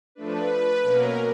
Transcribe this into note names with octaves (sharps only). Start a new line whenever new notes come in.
F3 A3 D4 B4
B2 F#3 A#3 C#4 A#4